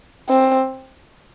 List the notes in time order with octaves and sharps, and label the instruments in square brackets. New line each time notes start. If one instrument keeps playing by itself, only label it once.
[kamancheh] C4